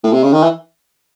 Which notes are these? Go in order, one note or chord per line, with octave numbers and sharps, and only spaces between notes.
A2
C3
C#3
D#3
E3